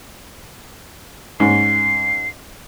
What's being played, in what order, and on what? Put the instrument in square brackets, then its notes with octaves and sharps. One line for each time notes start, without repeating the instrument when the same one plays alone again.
[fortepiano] G#2 C#4 [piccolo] C7